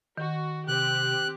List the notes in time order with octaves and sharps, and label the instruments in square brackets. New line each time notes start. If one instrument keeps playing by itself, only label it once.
[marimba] D#3 [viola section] F#4
[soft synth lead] C3 [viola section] C4 G4 [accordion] F#6